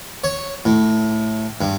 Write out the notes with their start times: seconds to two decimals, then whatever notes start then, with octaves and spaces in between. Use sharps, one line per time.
0.24 C#5
0.65 A2
1.61 G2